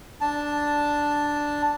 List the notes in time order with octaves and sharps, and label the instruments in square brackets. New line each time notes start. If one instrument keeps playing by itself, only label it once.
[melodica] D4 A5